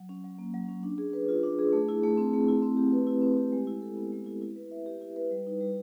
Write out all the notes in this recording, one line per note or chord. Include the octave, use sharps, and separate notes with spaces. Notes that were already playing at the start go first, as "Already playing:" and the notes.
Already playing: F#3
C#4
F#3
A#3
F#3
C#4
D4
G#4
B4
F4
D4
G#4
A3
E4
A3
C4
A3
E4
C4
G4
B4
E4
C4
G4
G#3
E4
A4
B3
G#3
E4
E4
B4
E5
G4
E4
B4
G3
D#4
G3